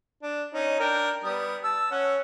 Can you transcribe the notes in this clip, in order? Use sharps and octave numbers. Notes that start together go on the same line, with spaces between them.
D4
C#4 D#4
D4 A#4 G5
G3 B3 D#6
A5 E6
C#4 F#5